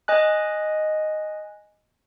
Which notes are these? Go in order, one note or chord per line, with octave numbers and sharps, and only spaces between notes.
D#5 G#5 F#6